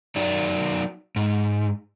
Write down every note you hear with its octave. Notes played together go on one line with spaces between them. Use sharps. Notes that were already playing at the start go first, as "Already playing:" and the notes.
F#3 D#4 D5
G#2